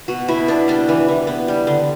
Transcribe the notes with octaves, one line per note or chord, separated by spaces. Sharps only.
B2 F#4
B2 E4
B3 D4
G3 D4
E3
E3
B3
G3
D3